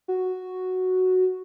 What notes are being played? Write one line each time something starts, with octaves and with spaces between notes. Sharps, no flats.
F#4